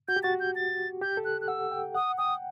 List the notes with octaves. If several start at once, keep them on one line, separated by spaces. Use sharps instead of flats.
F#4 G6
G4
F#4 A6
G6
A6
G4 G6
A4
F#6
F#6
F#5 E6
G5
F#5 D#6
G5 D#6